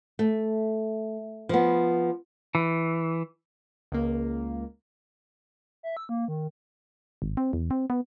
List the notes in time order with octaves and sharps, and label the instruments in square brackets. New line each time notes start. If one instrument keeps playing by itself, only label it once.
[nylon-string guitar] A3
F3 B3
[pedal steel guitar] E3
[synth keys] C#2 A#3
[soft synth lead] E5
E6
A#3
D#3
[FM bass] G#1
C4
E2
C4
B3